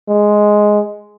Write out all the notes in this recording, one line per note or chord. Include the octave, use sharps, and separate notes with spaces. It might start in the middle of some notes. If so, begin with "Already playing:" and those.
G#3